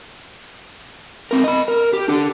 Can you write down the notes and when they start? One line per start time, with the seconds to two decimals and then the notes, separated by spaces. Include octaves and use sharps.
1.31 C4 A#4
1.44 D#5 B5
1.68 A#4
1.93 G4
2.08 D4 A4